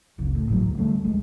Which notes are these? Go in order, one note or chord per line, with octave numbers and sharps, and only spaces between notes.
F#1 C#2
A2
G1 A2 C#3 F#3
D2
D3 G3 A3 D4
D1 A#1 G#3